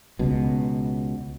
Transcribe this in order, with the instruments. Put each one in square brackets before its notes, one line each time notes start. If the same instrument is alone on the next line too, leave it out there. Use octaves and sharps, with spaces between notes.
[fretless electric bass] C#2 B2